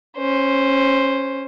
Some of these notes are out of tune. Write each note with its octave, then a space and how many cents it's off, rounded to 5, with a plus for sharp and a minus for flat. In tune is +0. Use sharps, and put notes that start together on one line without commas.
C#4 -15 C5 +0